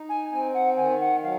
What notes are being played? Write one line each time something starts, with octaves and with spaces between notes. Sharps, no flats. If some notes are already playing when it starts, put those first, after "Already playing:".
Already playing: D#4
G#5
C4 G#5
F#5
D#3 G#5
F#5
F#3 F5